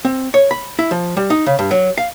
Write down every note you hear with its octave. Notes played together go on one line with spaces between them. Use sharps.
C4
C#5
B5
E4
F3
G3
D#4
C#3
G2
F#3
F5